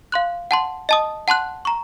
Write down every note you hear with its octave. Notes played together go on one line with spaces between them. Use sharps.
F5 C6 F#6
F#5 A5 C6
D#5 A5 D#6
F#5 A5 C6 F#6
A#5 C#6